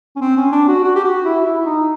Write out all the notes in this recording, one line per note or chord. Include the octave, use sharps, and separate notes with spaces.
C#4
C4
C#4
D4
F#4
F#4
G4
F#4
E4
E4
D#4